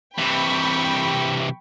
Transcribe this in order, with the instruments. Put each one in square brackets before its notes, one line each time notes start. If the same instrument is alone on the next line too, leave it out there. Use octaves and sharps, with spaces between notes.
[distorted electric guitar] C3 E3 [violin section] G5 B5 C#6